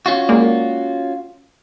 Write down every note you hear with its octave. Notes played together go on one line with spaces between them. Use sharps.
C#4 F4 F#4
G#3 A#3 D5